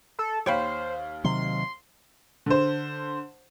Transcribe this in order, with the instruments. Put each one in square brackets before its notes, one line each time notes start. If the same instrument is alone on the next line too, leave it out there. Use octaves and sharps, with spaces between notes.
[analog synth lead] A4
[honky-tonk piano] D#2 F5 [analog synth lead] C5 [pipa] C#5 G5 B5
[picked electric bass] C3 D#3 F#3 [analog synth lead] C6
[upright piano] D3 C5